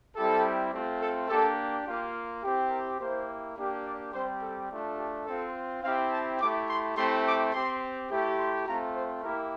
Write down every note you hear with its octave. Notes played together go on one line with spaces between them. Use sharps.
G3 C4 E4 G4 A4
A3 C4 F4
A4
A#3 D4 G4 A4
A#3 F4 G4
C4 E4 G4
A#4
A#3 E4 G4 C5
A#3 D4 G4
D5
G3 C4 G4 C5
A4
A3 D4 F4
G4
C4 F4 A4
C4 E4 G4 F5
A5
A3 E4 G4 D6
C6
A3 C4 E4 G4 C6
D6
C4 G4 C6
A3 E4 G4
C6
A3 C4 F4 A#5
C5
A#3 E4 G4 A#4